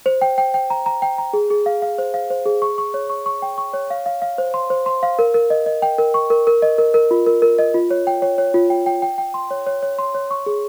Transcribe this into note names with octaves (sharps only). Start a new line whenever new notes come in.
C5
G5
G5
G5
A#5
A#5
G5
A#5
G#4
G#4
F5
F5
C5
F5
C5
G#4
C#6
C#6
C#5
C#6
C#6
G5
C#6
C#5
F5
F5
F5
C5
C6
C5
C6
F5
A#4
A#4
D#5
D#5
G5
A#4
C#6
A#4
A#4
D#5
A#4
A#4
F4
A#4
A#4
D#5
F4
C#5
G5
C#5
C#5
F4
G5
G5
G5
G5
C6
C#5
C#5
C#5
C6
C#5
C#6
G#4